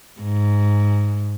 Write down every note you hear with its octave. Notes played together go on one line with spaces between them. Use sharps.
G#2